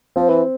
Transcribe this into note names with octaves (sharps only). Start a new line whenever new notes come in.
F3 C4
E3